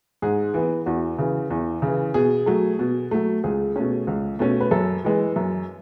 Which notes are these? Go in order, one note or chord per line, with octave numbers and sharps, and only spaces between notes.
G#2 G#4
E3 B3
E2 F#4
C#3 E3
E2
C#3 E3
B2 G#4
F#3 A3
B2
F#3 A3
C#2 G#4
B2 A3 C#4
C#2
B2 A3 C#4
B4
F#2 A4
E3 G#3
F#2